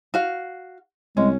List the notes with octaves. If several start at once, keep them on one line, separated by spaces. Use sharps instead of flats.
F#4 F5
C2 G#3 C#4